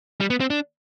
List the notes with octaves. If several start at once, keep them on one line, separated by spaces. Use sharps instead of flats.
G3
B3
C4
D4